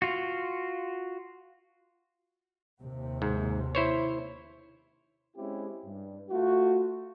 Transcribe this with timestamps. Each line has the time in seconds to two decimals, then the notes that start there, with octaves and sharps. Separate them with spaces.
0.02 F4 F#4
2.81 D#2 C3
3.22 G#2
3.75 E4 C5 C#5
5.37 G#3 C4 C#4 E4 G4
5.85 G2
6.30 A3 F4 F#4